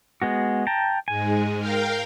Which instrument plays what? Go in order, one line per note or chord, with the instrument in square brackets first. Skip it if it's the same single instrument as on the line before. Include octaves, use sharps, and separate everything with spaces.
[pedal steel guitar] G#3 B3 F#4
G5 A5 A#5
[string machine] G#2 G#3 [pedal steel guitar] G#5
[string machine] A#4 F5 G5